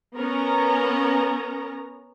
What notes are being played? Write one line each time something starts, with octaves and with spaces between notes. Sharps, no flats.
B3 C#4 A#4 A#5